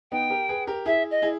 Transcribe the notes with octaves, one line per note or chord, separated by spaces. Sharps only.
B3 D#4 G5
G4 A#4
G#4 B4
G4 A#4
E4 G#4 E5
D#5
E4 G#4